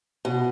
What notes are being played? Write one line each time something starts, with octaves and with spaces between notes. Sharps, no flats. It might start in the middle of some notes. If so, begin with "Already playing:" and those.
B2